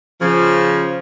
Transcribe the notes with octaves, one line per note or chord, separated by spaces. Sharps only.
C#3 F3